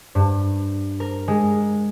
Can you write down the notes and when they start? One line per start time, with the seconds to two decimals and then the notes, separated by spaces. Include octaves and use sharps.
0.15 G2
1.00 A#4
1.28 G#3